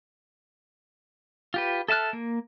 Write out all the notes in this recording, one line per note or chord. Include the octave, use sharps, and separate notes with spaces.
F4 G4 B4
A4 E5 A5 F6 F#6
A#3